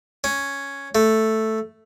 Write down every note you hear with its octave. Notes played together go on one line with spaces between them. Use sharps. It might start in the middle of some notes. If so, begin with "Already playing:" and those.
C#4
A3